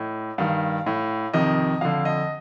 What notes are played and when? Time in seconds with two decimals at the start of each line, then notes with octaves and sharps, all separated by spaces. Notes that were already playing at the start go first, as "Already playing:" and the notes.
Already playing: A2 D#5
0.38 G2 D#3 F5
0.86 A2
1.33 F2 C3 D#3 D#5
1.81 F2 D3 F5
2.05 D#5